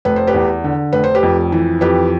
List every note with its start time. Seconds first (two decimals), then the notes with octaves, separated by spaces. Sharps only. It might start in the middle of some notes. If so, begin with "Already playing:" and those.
0.05 F1 B4
0.16 C5
0.27 G4 B4
0.34 E2
0.64 D3
0.93 F1 B4
1.04 C5
1.15 G4 B4
1.23 F2
1.52 E3
1.81 F2 G4 B4